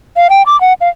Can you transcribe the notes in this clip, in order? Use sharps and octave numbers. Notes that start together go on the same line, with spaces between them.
F5
G5
D6
F#5
F5